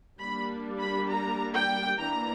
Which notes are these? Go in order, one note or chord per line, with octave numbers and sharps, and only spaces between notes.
G3 A#3 D4 B5
B5
A#5
G5
E3 A#3 D4 A#5